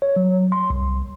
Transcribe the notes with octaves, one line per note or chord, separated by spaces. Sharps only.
C#5
F#3
C6
C2